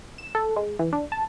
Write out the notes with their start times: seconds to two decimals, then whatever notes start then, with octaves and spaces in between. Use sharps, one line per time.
0.18 E7
0.35 A4
0.56 G#3
0.79 E3
0.93 D4
1.12 A5